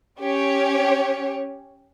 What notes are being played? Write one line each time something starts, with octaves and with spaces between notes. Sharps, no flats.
C#4 G4 C#5